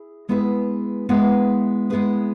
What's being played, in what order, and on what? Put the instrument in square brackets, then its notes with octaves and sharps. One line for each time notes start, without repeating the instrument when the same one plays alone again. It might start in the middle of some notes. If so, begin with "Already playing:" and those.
Already playing: [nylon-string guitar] E4 G#4
G#3 B3 E4 G#4 B4
G#3 B3 E4 G#4 B4
G#3 B3 E4 G#4 B4